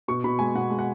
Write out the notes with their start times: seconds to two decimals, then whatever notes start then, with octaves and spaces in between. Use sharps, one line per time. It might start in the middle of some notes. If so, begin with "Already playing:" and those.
0.08 B2 C#6
0.24 B2 B5
0.39 G#3 G#5
0.55 B2 F#5
0.70 G#3
0.79 F#5